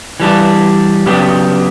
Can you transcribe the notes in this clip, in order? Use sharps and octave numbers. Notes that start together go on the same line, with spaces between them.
E3 G3 D4
C#3 F#3 B3 D4 G4